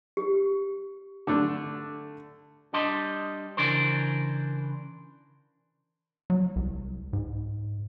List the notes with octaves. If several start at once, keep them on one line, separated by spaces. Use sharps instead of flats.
G4
D3 A3 D4
G3 D4 D#5 A5 C6
C#3 E3 D4 A#4 C5
F#3
C2
G#2